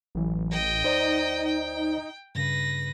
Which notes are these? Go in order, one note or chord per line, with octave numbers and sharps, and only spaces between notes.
A1 E3 F#3
D#5 G5
D2 D#4 C5 D5
G5
G2 C#3 B4 A#6